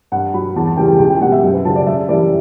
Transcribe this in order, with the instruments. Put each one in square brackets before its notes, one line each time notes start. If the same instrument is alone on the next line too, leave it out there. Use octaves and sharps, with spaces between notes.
[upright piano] G2 F#5
F#3 B5
E2 A5
A5
C#3 E3 G3 G5
G5
C#2 G5
G5
B2 G3 F#5
E5
F#2
B4
C#3 F#3 A5
D5
F#2 E5
E3 G3 D5